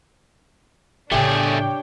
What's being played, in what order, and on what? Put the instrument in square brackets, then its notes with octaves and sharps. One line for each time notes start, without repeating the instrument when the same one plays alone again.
[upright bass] A1 C#3 [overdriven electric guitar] A3 G#4 [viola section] D4 C#5 G5 [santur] G4